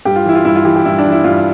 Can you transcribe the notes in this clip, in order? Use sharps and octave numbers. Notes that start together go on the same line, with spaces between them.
G2 G4
F4
E3 E4
F4
G2 E4
F4
E3 G4
G4
G2 E4
D4
E3
E4
G2 F4